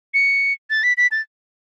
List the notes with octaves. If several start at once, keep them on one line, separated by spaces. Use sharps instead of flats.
C#7
A6
B6
B6
A6